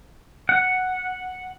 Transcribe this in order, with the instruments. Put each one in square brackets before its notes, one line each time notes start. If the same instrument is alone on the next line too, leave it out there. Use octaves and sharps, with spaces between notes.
[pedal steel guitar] F#5